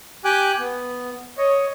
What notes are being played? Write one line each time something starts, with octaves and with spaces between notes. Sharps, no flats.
G4 G5 G#5 D6 F#6
B3
C#5 D#5